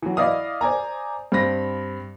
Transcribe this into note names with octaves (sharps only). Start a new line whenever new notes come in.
E3 F#3
E4 D5 D#5 F5 D#6
C5 D5 G#5 A#5
G2 C4 B5 A#6